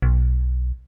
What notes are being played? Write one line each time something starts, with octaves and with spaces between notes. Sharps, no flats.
B1